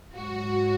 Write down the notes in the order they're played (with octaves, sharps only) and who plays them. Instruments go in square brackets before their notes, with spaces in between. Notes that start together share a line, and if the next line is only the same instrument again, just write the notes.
[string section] G#2 F#3 F#4